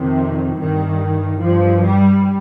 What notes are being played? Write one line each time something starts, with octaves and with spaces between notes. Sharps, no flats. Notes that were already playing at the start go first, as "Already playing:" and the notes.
Already playing: F2 C3 D#3
G2 D#3
G2 F3
G3